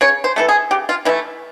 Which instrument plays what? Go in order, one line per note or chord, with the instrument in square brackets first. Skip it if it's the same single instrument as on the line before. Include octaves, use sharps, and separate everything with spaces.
[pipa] C#3 C#5
C5
E3 A3 A4
G#4
C#3 G4
F4
E3 A3 E4